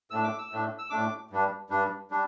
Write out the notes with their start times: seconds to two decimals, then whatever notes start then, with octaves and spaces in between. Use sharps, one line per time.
0.10 A2 A3 D4 E6
0.24 D6
0.38 E6
0.51 A2 A3 D4
0.79 E6
0.90 A2 A3 D4 D6
1.31 G2 G3 D4
1.70 G2 G3 D4
2.11 G3 D4